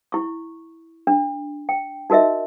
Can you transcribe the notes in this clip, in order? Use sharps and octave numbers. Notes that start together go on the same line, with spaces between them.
E4 C#6
D4
G5
D#4 F#4 A#4 D#5 E5